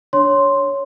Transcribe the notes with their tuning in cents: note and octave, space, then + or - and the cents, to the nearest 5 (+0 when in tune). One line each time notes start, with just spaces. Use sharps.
D4 -5 C#5 +0 C6 +0